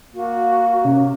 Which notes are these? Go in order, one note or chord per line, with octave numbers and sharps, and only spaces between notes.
A#3 F#4
C3 C#4